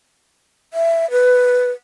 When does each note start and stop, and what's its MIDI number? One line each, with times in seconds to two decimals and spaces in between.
0.74 1.09 76
1.11 1.71 71